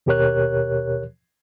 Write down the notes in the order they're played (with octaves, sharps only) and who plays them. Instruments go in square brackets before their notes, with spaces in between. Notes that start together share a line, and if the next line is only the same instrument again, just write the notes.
[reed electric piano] D#2 B2 G4 A#4 C#5 F#6